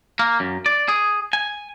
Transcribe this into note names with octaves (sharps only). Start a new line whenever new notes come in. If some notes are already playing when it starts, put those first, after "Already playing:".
A#3
F#2
D5
G#4
G#5